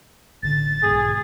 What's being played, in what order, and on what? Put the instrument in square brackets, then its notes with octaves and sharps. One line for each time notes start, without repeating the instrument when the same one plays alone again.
[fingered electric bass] A1 D3 [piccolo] A6
[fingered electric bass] B1 G#2 B2 [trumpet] G#4